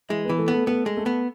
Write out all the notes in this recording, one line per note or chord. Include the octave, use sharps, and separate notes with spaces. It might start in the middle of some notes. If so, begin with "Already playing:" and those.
E3 G#3 E4
B3 B4
E3
A3 A4
B3
A3 A4
A3 B3 A4
G#3
A3 A4
B3